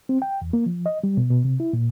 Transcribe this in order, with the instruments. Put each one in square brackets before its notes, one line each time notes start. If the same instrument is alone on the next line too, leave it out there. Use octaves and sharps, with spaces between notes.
[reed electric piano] C4
G5
E2
A#3
F3
D#5
G3
B2
B2
C3
E4
A#2